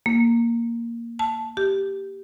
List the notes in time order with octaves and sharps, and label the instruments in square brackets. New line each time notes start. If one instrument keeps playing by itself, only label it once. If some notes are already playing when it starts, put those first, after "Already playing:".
[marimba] A#3
A5
G4